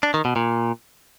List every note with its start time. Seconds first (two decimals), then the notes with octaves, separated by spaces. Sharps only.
0.03 D4
0.14 D#3
0.25 B2
0.36 A#2